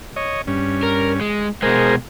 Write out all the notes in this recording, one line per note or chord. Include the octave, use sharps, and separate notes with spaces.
C#5 D#5
G2 C#4
A#4
G#3
B2 G#3 G#4 A#4 C5